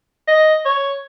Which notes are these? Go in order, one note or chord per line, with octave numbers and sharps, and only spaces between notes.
D#5
C#5